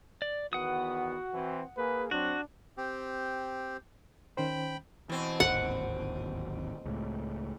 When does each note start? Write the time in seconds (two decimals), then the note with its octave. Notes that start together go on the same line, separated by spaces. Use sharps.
0.22 D5
0.53 E2 D#3 B3 F#4 F#5 D#6
1.34 E3 C4
1.77 A#3 G#4 B4
2.11 F#3 C4 D4 F#4
2.77 C4 G4
4.37 D#3 C#4 C5 G5 B5
5.10 B2 E3 C4
5.40 D1 G#1 D#2 F#5
6.86 C#2 A2